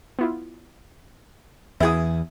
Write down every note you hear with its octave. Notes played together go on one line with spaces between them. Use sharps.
B3 E4 F4
E2 E3 B3 E4 G#4 D#6